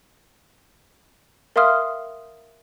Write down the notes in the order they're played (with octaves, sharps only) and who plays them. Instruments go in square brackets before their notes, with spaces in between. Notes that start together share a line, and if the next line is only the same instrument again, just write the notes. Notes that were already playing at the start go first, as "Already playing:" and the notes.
[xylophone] A#4 E5 F5 C6 D#6 F6